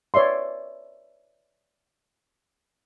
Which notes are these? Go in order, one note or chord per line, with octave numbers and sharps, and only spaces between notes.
B4 C#5 D5 E5 C6